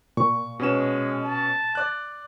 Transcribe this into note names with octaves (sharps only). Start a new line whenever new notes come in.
A#2 C#6
B2 G#3 C#4 E7
A5
D5 F#6